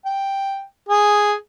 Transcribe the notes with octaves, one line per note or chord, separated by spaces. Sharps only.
G5
G#4